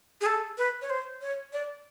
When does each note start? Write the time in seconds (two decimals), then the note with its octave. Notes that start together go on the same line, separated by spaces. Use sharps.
0.21 G#4
0.26 A4
0.58 B4
0.81 C#5
0.90 C5
1.21 C#5
1.53 D5